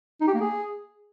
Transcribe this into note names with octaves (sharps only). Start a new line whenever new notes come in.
D#4
G4
A#3
G#4